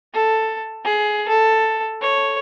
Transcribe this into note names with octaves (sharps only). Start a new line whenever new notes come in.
A4
G#4
A4
C#5